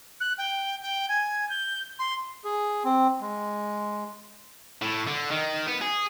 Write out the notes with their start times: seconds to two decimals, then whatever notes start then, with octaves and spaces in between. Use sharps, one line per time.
0.20 F#6
0.38 G5
0.82 G5
1.08 G#5
1.49 G6
1.99 C6
2.44 G#4
2.84 C4
3.21 G#3
4.82 A2
5.07 D3
5.31 D#3
5.68 B3
5.82 G#4